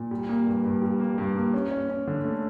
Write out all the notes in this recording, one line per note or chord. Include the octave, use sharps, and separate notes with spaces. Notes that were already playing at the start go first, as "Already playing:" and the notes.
Already playing: A#2
G3
A#3
G2
G2
G3
A#3
G2
A#3
C#4
C#4
C#4
D3
A3